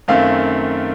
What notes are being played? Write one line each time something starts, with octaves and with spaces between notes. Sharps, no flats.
F#2 D#3 A3 C4 F5